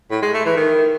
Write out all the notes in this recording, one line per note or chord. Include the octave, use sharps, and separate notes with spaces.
A2
G#3
A3
E3
D#3